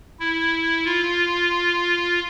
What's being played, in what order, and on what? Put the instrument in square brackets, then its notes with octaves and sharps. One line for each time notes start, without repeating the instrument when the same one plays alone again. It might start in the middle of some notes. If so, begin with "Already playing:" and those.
[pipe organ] E4
F4